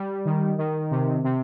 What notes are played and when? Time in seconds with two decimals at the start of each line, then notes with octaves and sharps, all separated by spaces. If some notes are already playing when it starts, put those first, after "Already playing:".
Already playing: G3
0.25 D#3
0.58 D#3
0.91 C3
1.24 C3